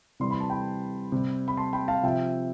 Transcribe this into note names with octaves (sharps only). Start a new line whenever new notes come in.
C3 E3 G3 C6
B5
A5
G5 B5
C3 G3
B5
A5 C6
G5 B5
F5 A5
C3 F3 E5 G5